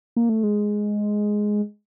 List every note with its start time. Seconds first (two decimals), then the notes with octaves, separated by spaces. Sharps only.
0.16 A#3
0.29 A3
0.43 G#3